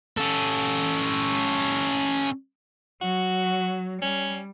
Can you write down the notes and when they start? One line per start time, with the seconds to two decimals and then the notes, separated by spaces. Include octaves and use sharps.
0.17 C#4 A4
3.02 F#3 F#4
4.02 G3 C#4